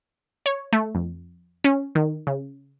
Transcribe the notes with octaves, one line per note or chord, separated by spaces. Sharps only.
C#5
A3
F2
C#4
D#3
C#3